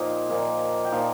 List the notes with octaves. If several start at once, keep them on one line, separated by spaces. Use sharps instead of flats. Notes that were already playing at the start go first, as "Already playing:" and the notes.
Already playing: A#2 F3 A#3 D#4 G5
A#2 F3 A#3 D#4
G5
A#2 F3 A#3 D#4 F5